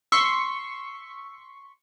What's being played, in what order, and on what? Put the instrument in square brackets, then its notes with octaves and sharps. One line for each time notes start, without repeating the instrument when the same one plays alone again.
[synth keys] C6 C#6 B6 [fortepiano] E6